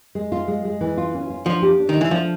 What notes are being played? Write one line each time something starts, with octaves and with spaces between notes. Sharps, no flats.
G#3
F4
G#3
G#3
E3
F4
C#4
F4
F3 D4
G4
D4
D#3
E3 A3
F3 D4